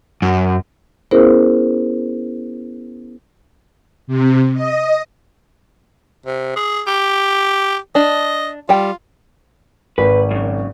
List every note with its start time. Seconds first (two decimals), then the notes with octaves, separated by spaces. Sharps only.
0.22 F#2
1.11 B3 C#4 E4 G#4 A#4 C5
4.07 C3
4.54 D#5
6.26 C3
6.56 G#4
6.87 G4
7.95 D4 D#5
8.69 G3 F4 G5
9.98 G#1 B4
10.31 F#2 C#3